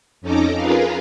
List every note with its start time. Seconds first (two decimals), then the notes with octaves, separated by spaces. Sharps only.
0.21 F2 C#4 D#4 A4 A#5 D6
0.56 F4 G#4 A#4 B4 F5